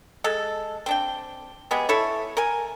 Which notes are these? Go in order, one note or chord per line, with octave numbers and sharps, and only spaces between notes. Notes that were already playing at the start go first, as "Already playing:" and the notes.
G#3 A4
C4 D4 G5
G#3 B3 G4 G#4
E4 A4 C#5
A#4 G#5